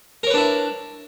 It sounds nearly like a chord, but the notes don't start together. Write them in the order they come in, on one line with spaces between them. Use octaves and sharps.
A#4 C#5 B4 D4 E4